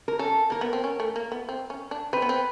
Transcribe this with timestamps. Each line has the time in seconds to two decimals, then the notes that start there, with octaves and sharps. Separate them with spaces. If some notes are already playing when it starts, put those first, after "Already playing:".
0.08 A#4
0.19 C#4 A4
0.50 A#3 A#4
0.61 B3
0.73 C4
0.84 C#4
1.00 A3
1.16 A#3
1.32 B3
1.49 C4
1.70 C#4
1.91 D4
2.13 C4 B4
2.22 B3
2.29 C4